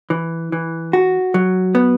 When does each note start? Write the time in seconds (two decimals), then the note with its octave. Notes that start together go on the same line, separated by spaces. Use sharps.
0.10 E3
0.52 E3
0.93 F#4
1.34 F#3
1.75 B3